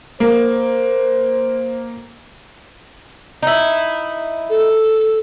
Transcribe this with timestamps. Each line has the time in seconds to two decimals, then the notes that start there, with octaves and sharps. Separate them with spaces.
0.20 A#3 C5
3.43 D#4 E4
4.50 A4